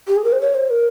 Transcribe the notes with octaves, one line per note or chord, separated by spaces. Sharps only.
G4
G#4
A#4
C5
C#5
C5
A#4